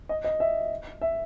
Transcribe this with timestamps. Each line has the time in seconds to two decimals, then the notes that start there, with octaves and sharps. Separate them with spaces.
0.09 D#5
0.24 D#5
0.40 E5
1.01 E5